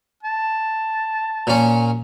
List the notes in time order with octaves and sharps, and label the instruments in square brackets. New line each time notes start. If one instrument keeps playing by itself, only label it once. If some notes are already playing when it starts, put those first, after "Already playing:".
[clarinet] A5
[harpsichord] A#2 C#4